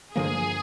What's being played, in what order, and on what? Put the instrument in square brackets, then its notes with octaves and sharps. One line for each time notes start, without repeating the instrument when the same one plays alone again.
[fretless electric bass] G2 D3 F3 A#3 [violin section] G#4